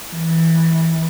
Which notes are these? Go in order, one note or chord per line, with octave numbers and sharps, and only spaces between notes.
E3